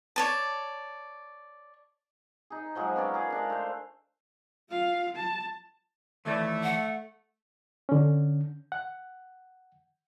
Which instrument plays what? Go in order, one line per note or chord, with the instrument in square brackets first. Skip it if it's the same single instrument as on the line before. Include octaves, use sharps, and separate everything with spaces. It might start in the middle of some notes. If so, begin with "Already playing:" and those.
[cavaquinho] C#5 D5 A5
[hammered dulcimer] D#4 G#4
F3 F#3 G#3
B3 C#4 D5 G5
G#4 A#4
G#3 D4 F5
A3 C5
[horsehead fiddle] F4 F5
A5
[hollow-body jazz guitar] D#2 E3 D5 [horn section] A3
[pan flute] F#5
[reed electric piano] D3 C#4
F#5